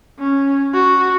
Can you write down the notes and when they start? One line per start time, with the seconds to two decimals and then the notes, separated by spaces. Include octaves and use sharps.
0.19 C#4
0.74 F#4